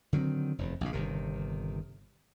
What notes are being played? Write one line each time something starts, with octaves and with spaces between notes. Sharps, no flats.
D3 D#3 F#3 C4
F1 E2
A#1 C#3
G1 C3 D#3